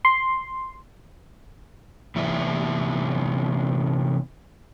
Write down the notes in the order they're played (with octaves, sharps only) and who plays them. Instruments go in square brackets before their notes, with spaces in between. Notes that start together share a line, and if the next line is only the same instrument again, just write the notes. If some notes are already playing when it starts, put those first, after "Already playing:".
[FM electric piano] C6
[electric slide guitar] C3 E3 B3 D#4 E5